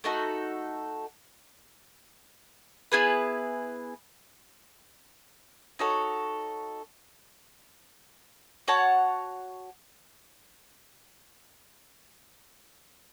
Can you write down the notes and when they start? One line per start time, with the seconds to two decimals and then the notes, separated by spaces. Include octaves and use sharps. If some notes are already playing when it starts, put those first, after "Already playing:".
0.04 A3 D#4 F#4 A4
2.92 B3 E4 G#4 B4
5.79 D#4 F#4 A4 C#5
8.68 F#4 C#5 F#5 A5